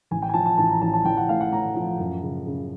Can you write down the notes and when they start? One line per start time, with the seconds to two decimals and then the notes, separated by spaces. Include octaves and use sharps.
0.11 A1 G#5
0.22 G5
0.29 G#5
0.34 F3 A5
0.46 A5
0.57 A1 A5
0.69 A#5
0.81 A1 A5
0.94 A5
1.05 A1 G5
1.17 F#5
1.28 A2 F5
1.40 F#5
1.52 A2 A#5
1.76 F3
1.99 F#2
2.22 C#3
2.47 C#3